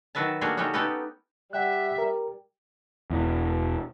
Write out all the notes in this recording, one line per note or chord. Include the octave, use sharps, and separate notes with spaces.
D#3 F#3 F#4 B4 E5 A5
G3 A3 A#3 D4 F#4 G#4
C#3 G3 A3 C#4 D#4 F#4
B3 C#4 D#4 G4 A4 B4
G3 E5 F#5 G5 F#6
A#4
E1 E2